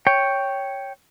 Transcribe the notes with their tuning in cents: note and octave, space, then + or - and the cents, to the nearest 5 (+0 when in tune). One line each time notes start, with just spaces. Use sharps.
C#5 +0 G5 +0